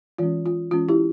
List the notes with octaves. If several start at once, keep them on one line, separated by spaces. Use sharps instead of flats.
E3 G#3 C#4 F4
F4
E3 G#3 C#4 F4
E4 G4